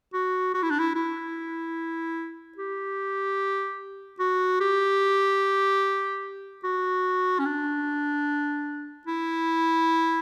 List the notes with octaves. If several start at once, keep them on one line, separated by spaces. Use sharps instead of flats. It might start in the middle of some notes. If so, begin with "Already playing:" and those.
F#4
F#4
E4
D4
E4
E4
G4
F#4
G4
F#4
C#4
D4
E4